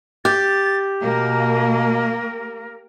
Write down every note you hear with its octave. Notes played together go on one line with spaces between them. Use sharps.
G4 A6
B2 A#3 A#4